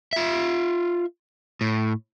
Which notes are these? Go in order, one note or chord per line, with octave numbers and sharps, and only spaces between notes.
F4 E5
A2